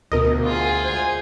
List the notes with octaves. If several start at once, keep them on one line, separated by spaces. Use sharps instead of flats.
D2 B2 A#4 D#5
F4 G#4
G#3 C5 G#5